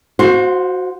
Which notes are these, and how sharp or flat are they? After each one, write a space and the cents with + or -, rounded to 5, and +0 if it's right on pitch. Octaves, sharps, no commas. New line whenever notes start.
F#4 -10 C5 +0 F5 +40